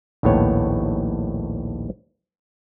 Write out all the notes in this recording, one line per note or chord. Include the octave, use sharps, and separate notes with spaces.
A#1 D#2 A2 B3 C#5 G5